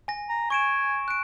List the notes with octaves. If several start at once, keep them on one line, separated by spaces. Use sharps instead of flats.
G#5 A#6
A#5
G#5 C#6 D7 E7
F#6 D7